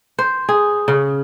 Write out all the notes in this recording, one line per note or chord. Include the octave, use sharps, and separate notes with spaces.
C5
G#4
C#3